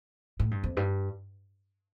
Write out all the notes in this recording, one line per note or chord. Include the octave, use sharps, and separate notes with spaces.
A2
G2
F2
G2